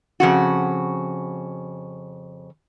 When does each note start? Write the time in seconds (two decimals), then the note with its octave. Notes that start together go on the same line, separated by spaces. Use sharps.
0.20 F2 C#3 F#4